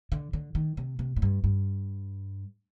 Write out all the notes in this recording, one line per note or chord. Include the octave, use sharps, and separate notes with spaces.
D3
D3
D#3
C3
C3
A2
G2
G2